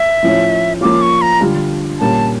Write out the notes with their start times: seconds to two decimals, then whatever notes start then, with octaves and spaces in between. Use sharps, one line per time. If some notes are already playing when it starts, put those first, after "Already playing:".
Already playing: E5
0.23 A2 F3 C#4
0.81 F3 A#3 C#4 F4 D6
1.02 C#6
1.22 A#5
1.41 D3 G3 D4 F4
1.99 A#2 G3 A#3 C#4 A5